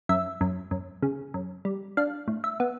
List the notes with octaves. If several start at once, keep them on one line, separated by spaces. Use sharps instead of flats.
F#2 E5
F#2
F#2
C#3
F#2
G3
D4 F5
A2
E5
B3